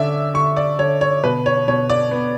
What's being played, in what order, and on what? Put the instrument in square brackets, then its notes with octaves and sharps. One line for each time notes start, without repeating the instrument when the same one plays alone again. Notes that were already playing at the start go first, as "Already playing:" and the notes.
Already playing: [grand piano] D3 C#4 D5 E5
D3 C#6
D5
D3 C#5
C#5
B2 B4
C#5
B2 C#5
D5
B3